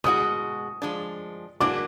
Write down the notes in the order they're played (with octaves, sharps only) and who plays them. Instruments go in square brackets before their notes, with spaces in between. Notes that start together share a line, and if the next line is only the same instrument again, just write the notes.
[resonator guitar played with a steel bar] B2 G#3 D4 F#4 [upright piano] D#6
[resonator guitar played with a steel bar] F3 G#3 D4
[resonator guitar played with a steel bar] F#3 A#3 D4 F#4 [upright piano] D6